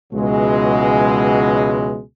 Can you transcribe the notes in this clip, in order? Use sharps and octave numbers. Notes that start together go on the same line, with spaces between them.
C#2 B2 E3 F#3 G#3